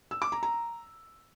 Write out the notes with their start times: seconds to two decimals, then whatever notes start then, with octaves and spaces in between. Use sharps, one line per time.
0.11 E6
0.22 D6
0.32 A#5
0.43 A#5